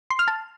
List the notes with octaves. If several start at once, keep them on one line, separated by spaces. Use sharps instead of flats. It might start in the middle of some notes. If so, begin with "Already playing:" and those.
C6
F6
A5